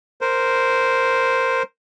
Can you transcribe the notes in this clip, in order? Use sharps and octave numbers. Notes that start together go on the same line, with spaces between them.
A#4 C5